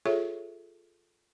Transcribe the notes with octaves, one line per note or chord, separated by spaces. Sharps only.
F4 G#4 A4 C#5 E5